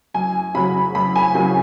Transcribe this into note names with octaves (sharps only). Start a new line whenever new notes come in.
F#2 G#5
C#3 F#3 B5
F#2 B5
G#5
C#3 F#3 G#5